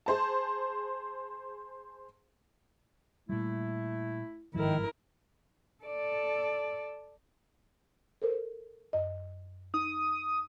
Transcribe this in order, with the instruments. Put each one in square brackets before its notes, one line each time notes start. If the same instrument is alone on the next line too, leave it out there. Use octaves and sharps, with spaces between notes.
[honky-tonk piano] G#4 C5 A5
[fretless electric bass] A#2 G3 [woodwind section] A3 E4
[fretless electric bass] G1 G#2 F3 [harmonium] D#3 [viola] E4 A#4
[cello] A4 D5
[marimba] A4 A#4 C5
F#2 D#5
[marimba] D#4 [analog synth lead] D#6